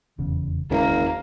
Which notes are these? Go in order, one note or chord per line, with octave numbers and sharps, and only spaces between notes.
F1 E2 C#3
F#1 D#2 D3 G#3 A#3